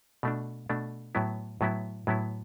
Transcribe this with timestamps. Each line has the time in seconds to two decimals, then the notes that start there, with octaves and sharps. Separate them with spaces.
0.23 B2 A3 D4
0.69 B2 A3 D4
1.15 A2 F#3 B3 E4
1.61 A2 F#3 B3 E4
2.07 A2 F#3 B3 E4